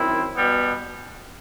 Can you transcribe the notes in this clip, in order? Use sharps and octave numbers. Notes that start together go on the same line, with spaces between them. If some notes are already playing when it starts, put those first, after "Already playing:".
Already playing: F#2 D#3 C4 E4
B2 G3 B3